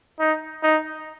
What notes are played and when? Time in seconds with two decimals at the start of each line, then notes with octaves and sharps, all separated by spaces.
0.19 D#4
0.63 D#4